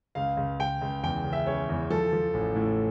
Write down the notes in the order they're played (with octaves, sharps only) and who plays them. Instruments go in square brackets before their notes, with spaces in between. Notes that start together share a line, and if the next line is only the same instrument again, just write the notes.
[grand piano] C#2 F5
C#2
C#2 G5
C#2
E2 G5
C#3
E5
C#3 C#5
E2
F3 A4
F3
A1
A2